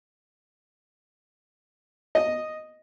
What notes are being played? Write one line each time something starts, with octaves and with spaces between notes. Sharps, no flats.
D#5